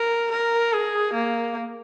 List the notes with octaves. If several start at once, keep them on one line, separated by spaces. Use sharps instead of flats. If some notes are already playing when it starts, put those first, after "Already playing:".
Already playing: A#4
A#4
G#4
A#3